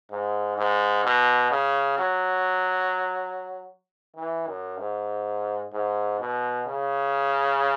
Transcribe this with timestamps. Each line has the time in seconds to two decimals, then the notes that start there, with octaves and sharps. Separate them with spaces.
0.11 G#2
0.57 G#2
1.04 B2
1.51 C#3
1.98 F#3
4.16 E3
4.47 F#2
4.79 G#2
5.73 G#2
6.20 B2
6.67 C#3